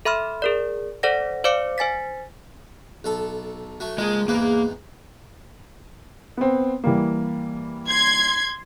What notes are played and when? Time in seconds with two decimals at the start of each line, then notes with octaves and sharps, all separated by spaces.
0.05 A4 E5 B5 C6 F6
0.42 G#4 A#4 D5
1.03 A4 C5 D5 F#5 A#6
1.44 C5 D5 F5 D6 C#7
1.78 C5 G#5 A6 B6
3.04 B1 A4
3.80 F#3 A3
3.98 C#2 F3 G#3 A#3 D#5
4.28 E2 G#2 A#3 B3
6.37 B3 C4
6.84 E3 G3 A#3
7.88 C6 G#6